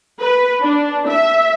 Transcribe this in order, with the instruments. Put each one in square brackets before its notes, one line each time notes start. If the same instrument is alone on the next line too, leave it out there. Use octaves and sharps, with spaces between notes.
[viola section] B4
D4
E5